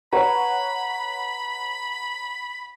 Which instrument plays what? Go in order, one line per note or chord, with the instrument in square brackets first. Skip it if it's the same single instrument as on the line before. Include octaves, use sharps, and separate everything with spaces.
[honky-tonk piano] B4 C#5 F#5 [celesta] A#5 [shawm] B5